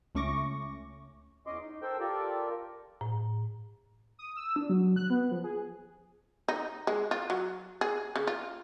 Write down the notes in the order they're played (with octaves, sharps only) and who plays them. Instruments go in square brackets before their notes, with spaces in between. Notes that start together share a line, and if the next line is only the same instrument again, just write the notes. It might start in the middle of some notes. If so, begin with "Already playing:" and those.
[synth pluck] C#2 A3 C#4 C#6 D6 A#6
[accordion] E2 C#4 D#5 C6 D6
D#4
A4 A#4 C5 G5 E6 G6
F4 G4 A4 A#4 D5
[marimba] A2
[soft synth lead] D#6
E6
D4
F#3
F#6
B3
F3
G#4
[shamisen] D#4
G#3
F4
F#3
G#4
C#3
F4